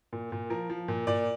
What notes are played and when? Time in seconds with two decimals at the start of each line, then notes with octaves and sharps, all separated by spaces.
0.13 A#2
0.32 A#2
0.50 F3 A#4
0.70 F3
0.88 A#2
1.07 A#2 D5